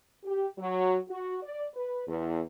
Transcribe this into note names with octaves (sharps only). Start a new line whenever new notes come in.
G4
F#3
F#4
D5
B4
E2